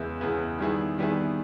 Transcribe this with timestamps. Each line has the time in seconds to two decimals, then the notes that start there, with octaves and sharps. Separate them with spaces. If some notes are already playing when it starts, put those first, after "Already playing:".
Already playing: E2 C#3 G#3 B3 E4
0.21 E2 C#3 G#3 B3 E4
0.59 D#3 G3 B3 E4 G#4
0.98 D#3 G3 B3 E4 G#4